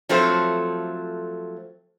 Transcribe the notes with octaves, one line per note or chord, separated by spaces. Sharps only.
F3 F#3 A3 C4 A4 C5